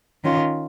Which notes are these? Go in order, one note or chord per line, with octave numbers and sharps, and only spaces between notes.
D#3 C#4 F4